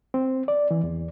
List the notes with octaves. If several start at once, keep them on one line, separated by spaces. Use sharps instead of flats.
C4
D5
E3
E2